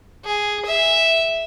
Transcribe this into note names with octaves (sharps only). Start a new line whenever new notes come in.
G#4
E5